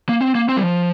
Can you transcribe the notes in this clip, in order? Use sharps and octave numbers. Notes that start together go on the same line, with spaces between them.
A#3
C4
A#3
C4
G3
F3